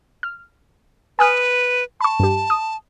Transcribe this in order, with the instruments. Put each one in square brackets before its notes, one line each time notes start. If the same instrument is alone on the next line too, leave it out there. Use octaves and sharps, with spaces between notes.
[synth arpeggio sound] F6
[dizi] B4 [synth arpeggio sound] G#5 D#6 F6
[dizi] A5 [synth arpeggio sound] B5 C#6
[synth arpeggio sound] G2 G4
D#6